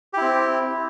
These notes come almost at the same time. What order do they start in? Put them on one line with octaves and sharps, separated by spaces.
G4 E4 C4